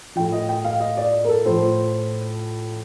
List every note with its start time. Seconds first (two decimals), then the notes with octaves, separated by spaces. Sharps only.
0.16 A2 F3 G5
0.32 D#5
0.49 G5
0.64 F5
0.80 D#5
0.97 D5
1.24 A#4
1.29 A4
1.45 A2 F3 C5